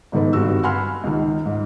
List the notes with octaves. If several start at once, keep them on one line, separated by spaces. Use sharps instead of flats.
G1 G#2 D#3 A4 B4
G#1 G2 D#3 F#4 E6
F#5 G#5 B5 C6 F6
C#2 D#3
G#2